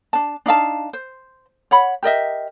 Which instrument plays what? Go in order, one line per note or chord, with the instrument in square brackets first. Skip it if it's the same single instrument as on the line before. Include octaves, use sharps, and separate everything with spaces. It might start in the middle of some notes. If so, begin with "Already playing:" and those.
[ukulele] D4 A5
D4 D#4 F5 A5
C5
C#5 F#5 B5
G4 A#4 D#5 E5